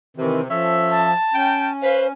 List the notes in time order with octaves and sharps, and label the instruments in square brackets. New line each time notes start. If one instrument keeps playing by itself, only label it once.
[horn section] C3 [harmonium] D#3 E3 C4
[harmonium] F3 [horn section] C#4 A4 E5
[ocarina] A5
[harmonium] C#4 [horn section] G5
[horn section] B4 F5 [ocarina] C5